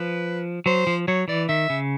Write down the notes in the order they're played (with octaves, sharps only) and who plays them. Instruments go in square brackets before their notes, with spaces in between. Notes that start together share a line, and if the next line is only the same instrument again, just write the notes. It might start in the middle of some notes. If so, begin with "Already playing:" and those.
Already playing: [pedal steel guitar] F3 [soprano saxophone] B4
[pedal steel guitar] F#3 [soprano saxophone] C5
[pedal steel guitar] F3
[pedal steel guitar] F#3 [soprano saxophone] C#5
[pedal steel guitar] E3 [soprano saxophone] D5
[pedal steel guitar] D#3 [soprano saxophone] E5
[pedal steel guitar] C#3